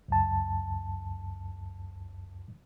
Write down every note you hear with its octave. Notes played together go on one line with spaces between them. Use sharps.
C#2 F#2 A5